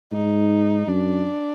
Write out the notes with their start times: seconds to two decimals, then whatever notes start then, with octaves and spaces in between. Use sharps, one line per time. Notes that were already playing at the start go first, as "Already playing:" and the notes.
0.12 G#2 D#4
0.88 F#2 D4